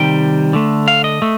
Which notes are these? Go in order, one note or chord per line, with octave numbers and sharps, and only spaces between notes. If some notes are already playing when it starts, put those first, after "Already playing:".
Already playing: C3 D#3 G3 G5
D3 A3
F5
D#5
A3